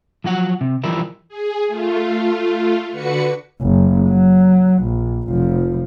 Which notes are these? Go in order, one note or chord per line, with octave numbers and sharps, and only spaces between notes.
F3 F#3 F#4 F#5
C3
E3 F3 G3 E4 A#4 E5
G#4
A3 F4
D3 F#4 B4 C#7
F#1
F#3
A#1
F1 F3